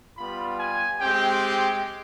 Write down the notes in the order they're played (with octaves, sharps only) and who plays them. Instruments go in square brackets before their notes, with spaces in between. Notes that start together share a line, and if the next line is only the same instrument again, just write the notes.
[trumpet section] G3 B3 F4 B5
G#5
G#3 C4 G4 G5
G5